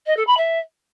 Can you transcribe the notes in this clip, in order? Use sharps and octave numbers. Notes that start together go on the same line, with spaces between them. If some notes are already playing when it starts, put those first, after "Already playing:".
D#5
A4
B5
E5